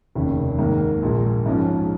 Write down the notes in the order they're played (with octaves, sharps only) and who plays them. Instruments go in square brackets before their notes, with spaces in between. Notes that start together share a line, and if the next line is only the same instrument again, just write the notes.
[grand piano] F1 D#2 C#3
G#2 D#3 A#3 A#4
A#1 A#2 G#3
G#2 F3 C#4